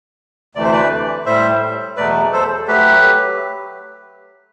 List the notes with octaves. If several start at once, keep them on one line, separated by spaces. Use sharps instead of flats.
D2 C3 E3 A3 D5
C5
B4 D5
A2 G3 C5 E5
E2 B2 F#3 A3 B4 D5
A4 C5
F#3 A3 G4 B4